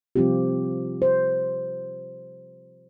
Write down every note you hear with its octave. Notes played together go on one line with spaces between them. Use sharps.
C3 F3 G3 C4 F4 G4
C5